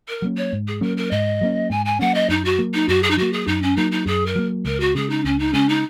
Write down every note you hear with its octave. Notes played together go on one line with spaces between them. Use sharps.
A#4
F#3 A#3 C#4
C#5
G#2
G#4
F#3 A#3 C#4 A#4
A#4
G#2 D#5
F#3 A#3 C#4
G#2 G#5
G#5
F#3 A#3 C#4 F#5
D#5
F#2 D#4
F#4
F#3 A#3
D#4
F#2 F#4
G#4
D#4
F#3 A#3 F#4
G#4
F#2 D#4
C#4
F#3 A#3 D#4
D#4
F#2 G#4
A#4
F#3 A#3
C#2 A#4
F#4
C#3 G#3 G#4
D#4
C#2 C#4
D#4
C#3 G#3 C#4
D#4